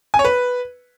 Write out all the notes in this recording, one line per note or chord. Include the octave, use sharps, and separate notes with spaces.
G#5
C#5
B4